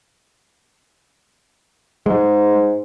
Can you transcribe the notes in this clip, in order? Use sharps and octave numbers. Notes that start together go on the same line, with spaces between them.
G#2 G#3